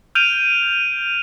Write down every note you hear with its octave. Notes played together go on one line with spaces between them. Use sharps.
F6 G6 D7 D#7 F7